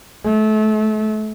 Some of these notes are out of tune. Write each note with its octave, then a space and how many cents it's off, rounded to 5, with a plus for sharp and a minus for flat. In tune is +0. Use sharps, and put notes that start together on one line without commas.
A3 -30